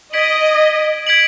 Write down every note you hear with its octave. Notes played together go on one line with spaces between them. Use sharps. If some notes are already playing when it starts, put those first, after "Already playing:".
D#5 G#6 B6 D7 F#7
G#6 B6 D7 F#7